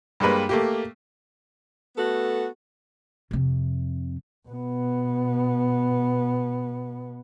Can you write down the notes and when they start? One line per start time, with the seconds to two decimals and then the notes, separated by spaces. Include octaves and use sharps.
0.20 G2 G3 G#3 A#3 B4
0.49 A3 A#3 G4
1.97 A3 B3 F#4 A4
3.31 F2 C3
4.49 B2 B3